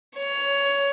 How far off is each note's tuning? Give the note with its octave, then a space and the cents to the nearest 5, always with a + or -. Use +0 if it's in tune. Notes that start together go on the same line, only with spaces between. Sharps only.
C#5 +15